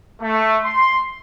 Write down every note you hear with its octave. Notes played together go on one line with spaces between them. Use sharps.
A3
C6